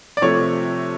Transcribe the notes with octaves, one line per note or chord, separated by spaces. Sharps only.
D5
C3 F3 A3 C#5